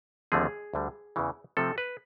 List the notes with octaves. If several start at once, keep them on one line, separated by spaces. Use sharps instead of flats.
D#2 D3 F3 A3 C4 G#4
D2 D3 G3
E2 C#3 E3
C3 F3 A3 C4 A4
B4